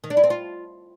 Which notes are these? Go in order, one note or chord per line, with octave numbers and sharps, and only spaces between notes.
D#3
D4
E4
C4
F4